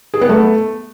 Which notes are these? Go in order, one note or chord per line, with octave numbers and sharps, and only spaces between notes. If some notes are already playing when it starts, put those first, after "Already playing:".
G#4
B3
A3